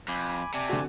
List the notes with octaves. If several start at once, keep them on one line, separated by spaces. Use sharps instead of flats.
F2 G#5 B5 D6
C3 D5 G#5 A5
D3 C4 F#4